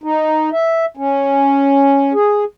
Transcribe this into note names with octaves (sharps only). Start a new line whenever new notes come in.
D#4
E5
C#4
G#4